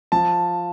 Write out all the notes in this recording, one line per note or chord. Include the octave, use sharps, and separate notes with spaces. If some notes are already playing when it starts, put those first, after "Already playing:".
F3 A5